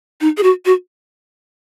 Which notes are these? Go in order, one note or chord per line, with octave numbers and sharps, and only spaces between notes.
D#4
G#4
F#4
F#4